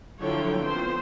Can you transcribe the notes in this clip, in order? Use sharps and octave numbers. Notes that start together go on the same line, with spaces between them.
D3 F3 F#3 E4 C#5 G5
B3 C4 F4 C5